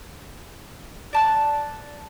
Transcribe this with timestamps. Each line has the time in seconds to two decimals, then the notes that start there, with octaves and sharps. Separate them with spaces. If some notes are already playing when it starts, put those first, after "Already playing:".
1.13 D5 A5 F#6